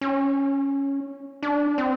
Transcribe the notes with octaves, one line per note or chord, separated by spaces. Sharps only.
C#4
D4
C4